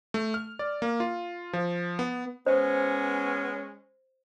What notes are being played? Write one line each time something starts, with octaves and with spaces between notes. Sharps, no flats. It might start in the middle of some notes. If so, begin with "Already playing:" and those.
A3
F6
D5
A#3
F4
F3
B3
G#3 B3 C#4 C5